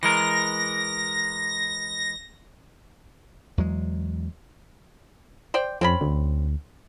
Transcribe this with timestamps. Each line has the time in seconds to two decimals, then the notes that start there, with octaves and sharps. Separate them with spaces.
0.03 E3 G#3 A#4 A#6
3.58 E2 F#3 G#3
5.54 C5 D5 G5
5.81 F2 C4 C#4 B5
6.01 D2